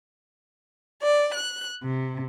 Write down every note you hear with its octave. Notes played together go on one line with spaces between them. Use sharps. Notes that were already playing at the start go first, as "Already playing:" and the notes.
D5
F#6
C3